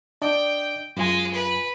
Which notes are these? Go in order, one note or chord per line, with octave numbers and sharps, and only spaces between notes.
D4 D5 D#5 G5
F#2 G#3 F4 G#5
B4